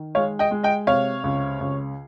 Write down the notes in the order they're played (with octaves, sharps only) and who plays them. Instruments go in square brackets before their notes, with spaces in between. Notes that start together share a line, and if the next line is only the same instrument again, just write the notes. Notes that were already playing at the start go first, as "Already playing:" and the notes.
Already playing: [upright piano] D#3
G#3 C#5 F5
D#5 G5
G#3
D#5 G5
C3 C#5 F5
C#2
C#2